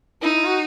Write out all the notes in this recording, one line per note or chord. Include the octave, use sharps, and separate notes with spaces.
D#4 E4
E4
F#4